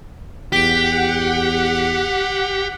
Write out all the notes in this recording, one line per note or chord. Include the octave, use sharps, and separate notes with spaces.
E2 G4 F#5 B6 D7